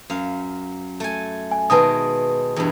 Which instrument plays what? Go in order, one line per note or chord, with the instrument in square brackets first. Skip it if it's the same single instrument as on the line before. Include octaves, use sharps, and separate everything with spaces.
[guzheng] F#2 F5
A3 G#5
[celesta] G#5
[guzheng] B2 D#3 G#3 [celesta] B4 A5 D#6
[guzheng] E2 G2